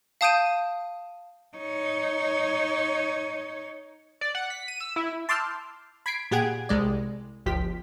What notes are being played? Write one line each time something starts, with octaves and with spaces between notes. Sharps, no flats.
F5 A5 D#6 G6 D7 D#7
D#4 C#5
D5
F#5
B6
D#7
E6
E4
A5 C6 D6 E6 F6 G6
B5 G#6 B6 C7 D7
A#2 G4 G#4 F#5 G#6 D7
C2 G#3 D5
G1 C#2 F3 G4 B6